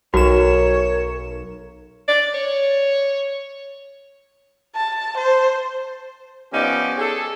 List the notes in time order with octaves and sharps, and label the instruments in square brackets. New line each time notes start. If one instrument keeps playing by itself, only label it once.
[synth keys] B1 E7 [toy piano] F#4 [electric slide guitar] A#4 [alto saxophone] C#5
[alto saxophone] D5
C#5
[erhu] A5
C5
[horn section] F3 B3 C#4 D#4 G4 D5
G#4 A4